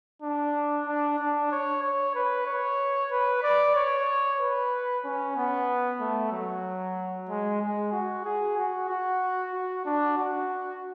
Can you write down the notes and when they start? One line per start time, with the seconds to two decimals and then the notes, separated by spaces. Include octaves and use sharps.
0.22 D4
0.86 D4
1.19 D4
1.51 C#5
1.83 C#5
2.15 B4
2.46 C#5
3.11 B4
3.43 D5
3.76 C#5
4.39 B4
5.04 C#4
5.36 B3
6.00 A3
6.32 F#3
7.29 G#3
7.61 G#3
7.92 F#4
8.25 G#4
8.57 F#4
8.89 F#4
9.53 F#4
9.85 D4
10.18 F#4